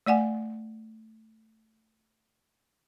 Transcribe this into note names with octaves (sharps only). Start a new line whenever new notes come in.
A3 D5 F#5 G#5